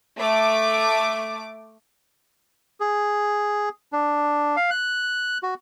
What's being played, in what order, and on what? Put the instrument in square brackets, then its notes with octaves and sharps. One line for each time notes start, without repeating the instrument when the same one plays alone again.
[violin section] A3 D6
[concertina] G#4
D4
F5
F#6
F#4